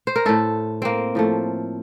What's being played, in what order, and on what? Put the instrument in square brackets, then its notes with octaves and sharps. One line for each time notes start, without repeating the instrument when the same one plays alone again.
[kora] C5
A#4
A2 A3 A4
A#3 C4
A2 F3 A3